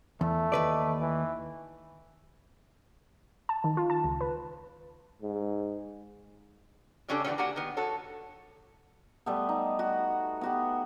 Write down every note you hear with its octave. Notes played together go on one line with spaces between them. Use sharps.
E2 A3
D#2 B4 D5
E3
A5
D#3
F4
A5
C#2
B4
G#2
C#3 G3 C#4 D4 G4 A4
D3 E3 G3 A3 B3 C#4
A#3 D4 F#4 G4 F#5 G#5
D#3 B3
F#4 A4 C#5
G3 A3 B3
D#4
F#4
B3 F#4 G4